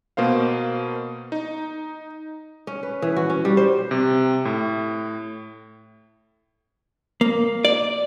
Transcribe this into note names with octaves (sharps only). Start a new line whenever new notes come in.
B2 A#3 C5 F5
D#4
C#4
B4
E3
F#4
C#4
G3
C5
C3
A2
A#3
D5